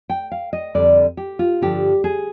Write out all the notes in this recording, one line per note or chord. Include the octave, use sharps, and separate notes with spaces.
G5
F5
D#5
F2 D3 G3 D4 D5
G4
F4
G2 D3 F3 G4
G#4